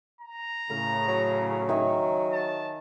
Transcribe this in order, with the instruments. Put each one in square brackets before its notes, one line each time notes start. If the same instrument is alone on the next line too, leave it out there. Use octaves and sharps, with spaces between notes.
[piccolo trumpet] A#5
[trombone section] A2 C#3 [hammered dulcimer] A#4
[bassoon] F#3
[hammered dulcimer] D#3 E5 G#5
[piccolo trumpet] A5